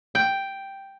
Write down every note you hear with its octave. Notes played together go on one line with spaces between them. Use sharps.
G5